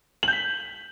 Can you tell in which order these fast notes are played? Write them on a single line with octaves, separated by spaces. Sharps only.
F#7 G6 B6